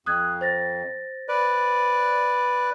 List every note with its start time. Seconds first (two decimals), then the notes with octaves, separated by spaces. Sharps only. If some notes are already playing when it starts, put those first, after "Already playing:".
0.06 F2 D#6 F#6 G#6
0.41 C5 A6 A#6
1.28 B4 D5